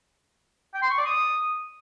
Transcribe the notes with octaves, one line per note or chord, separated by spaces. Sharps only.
G5
C6
C#6
D5
D#6